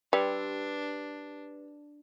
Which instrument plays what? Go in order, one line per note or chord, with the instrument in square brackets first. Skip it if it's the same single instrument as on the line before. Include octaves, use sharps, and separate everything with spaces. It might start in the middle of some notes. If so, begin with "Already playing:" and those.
[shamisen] G3 [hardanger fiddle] D4 [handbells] G4 B4